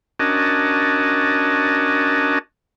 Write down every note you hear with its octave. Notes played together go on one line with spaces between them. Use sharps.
C#4 D4 F#4 A#4 D#5 A5